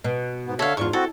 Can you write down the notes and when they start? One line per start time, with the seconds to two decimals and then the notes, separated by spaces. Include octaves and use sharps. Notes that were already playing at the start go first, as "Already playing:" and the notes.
0.04 B2
0.46 G#2 B3
0.59 D3 A4 C#5 E5 F5
0.77 E2 G#2 D4 F4 C#6
0.93 C4 E4 F#4 A4